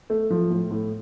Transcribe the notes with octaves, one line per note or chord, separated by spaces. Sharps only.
A3
F3
A2
A2